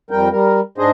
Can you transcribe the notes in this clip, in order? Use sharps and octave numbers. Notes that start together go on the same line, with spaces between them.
F2 G3 A#4 G5
G3 A#4
G#2 D4 G#4 C5 D#5